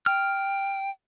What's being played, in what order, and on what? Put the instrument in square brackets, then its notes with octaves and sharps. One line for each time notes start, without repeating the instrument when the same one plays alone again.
[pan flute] G5 [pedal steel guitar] F6